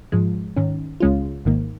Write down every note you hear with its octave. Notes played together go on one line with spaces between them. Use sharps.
G#2 F3 G#3
G#2 D#3 C#4
C#2 C#3 G#3 C#4 F4
G#1 G#2 D#3 A#3